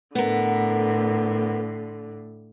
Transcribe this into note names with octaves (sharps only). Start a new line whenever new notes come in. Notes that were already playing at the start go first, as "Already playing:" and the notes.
A2 D3 B3 A#4